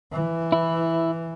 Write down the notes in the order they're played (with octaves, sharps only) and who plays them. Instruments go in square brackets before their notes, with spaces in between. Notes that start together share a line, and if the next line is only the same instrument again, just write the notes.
[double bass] E3
[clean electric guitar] E4